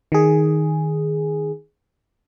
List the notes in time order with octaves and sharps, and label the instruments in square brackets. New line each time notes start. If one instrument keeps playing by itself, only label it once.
[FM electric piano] D#3 G#4